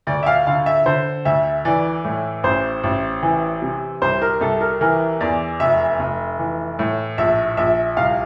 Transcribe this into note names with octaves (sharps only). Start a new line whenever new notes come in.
D2 D5
E5
F5
D3 F5
E5
D3 C5
D2 E5
E3 D5
A2
A1 C5
A1
E3
C3
C2 C5
A#4
C2 A4
A#4
E3 A#4
E2 D5
F1 E5
F1
E3
A2
A#1 E5
A#1 E5
C2 F5